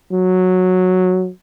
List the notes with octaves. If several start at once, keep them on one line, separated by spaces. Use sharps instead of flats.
F#3